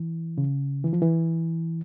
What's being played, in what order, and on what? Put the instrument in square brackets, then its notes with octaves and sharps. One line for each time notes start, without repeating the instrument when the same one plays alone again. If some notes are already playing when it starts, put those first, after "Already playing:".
Already playing: [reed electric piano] E3
C#3
E3
F3
E3